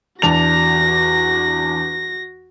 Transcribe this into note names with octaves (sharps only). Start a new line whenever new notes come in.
E2 D4 F#4 A#6 F7